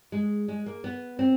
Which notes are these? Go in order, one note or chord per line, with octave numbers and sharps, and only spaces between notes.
G#3
G#3
A#3
B3
C4